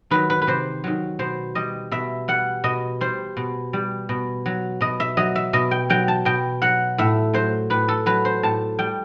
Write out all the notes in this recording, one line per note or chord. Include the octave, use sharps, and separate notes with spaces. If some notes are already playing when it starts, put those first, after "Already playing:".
D#3 F#3 B4
B4
B4
C3 C5
D#3 F#3
B2 C5
G3 D#5
B2 E5
G3 F#5
B2 D#5
G3 C5
B2
G3
B2
F#3
B2 D#5
E5
F#3 D#5
E5
B2 D#5
G5
F#3 G5
A5
B2 G5
F#3 F#5
A2 E5
F#3 C5
A2 B4
A4
F#3 B4
C5
A2 A5
G3 G5